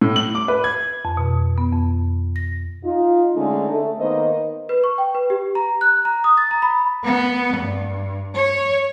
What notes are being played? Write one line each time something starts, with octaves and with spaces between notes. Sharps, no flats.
A2
F#7
D6
B4
G#6
F2
B2
B3
F2
A#6
D#4 F4
D3 G#3 A3 C#4 D#4
A3
D#3 A#3 B3 C5 D#5
B4
C#6
G5
B4
G4
A#5
F#6
A#5
D#6
A6
A#5
B5
B3
G2
C#5